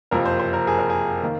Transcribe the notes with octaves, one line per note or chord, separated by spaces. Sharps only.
F#1 F2 C3 F3 A#4
C5
C5
A#4
G#4
A#4
G#4
D#3 A#3